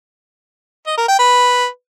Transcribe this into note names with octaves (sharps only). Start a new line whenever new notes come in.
D#5
A#4
G5
B4